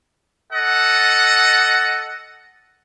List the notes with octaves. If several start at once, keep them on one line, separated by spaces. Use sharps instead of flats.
A4 D#5 F#5